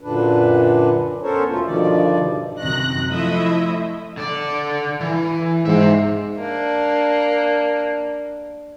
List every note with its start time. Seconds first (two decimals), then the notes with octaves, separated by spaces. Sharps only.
0.01 F#2 A#2 D3 D4 B4
1.22 B3 C#4 A4 A#4 C5 C#5
1.49 D#2 B2 A3 C#4 F4
1.65 G2 B2 D3 D#3 F3 D5
2.59 F#2 C3 D#3 F#3 F#6 A#6
3.08 F3 A3 E4 D#5 E5
4.17 D3 D5
5.01 E3
5.66 G#2 C5 E5
6.37 A#3 D4